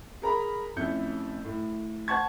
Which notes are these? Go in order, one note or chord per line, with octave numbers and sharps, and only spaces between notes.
G#4 A#4 A#5 B5
F2 A2 C#4 E4 G6 C#7
A2
C5 F#5 A5 C#6 G#6